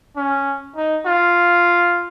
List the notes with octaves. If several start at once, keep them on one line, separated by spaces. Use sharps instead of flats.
C#4
D#4
F4